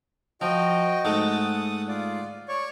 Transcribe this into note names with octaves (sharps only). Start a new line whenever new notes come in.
F3 F#4 D#5 G5
G#2 G#3 A3 F#5 D#6
F4 D5
C#5 D5 C#6